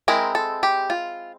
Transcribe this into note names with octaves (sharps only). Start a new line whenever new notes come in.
G#3 C4 E4 A#4
A4
G4
F4